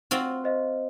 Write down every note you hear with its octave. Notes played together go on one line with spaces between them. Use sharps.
C4 F4 F#4 F#5
C5 D#5 F5